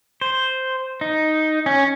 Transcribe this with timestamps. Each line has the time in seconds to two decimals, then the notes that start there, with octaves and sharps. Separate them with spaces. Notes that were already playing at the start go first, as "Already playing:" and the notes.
0.21 C5
1.01 D#4
1.66 C#4